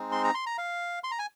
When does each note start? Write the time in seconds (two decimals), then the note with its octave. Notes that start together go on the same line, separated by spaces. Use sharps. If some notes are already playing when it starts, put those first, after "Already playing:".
Already playing: G#3 C4 D#4
0.12 C6
0.24 A#5
0.34 C6
0.46 A#5
0.58 F5
1.04 C6
1.11 A#5
1.19 G#5